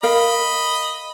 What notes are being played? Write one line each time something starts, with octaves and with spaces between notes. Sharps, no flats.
A#4 D#5 F5 B5